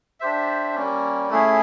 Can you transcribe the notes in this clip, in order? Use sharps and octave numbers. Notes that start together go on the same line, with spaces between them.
D4 G4 C5 E5
G3 A#3 C#4
A3 C#4 E4 G#4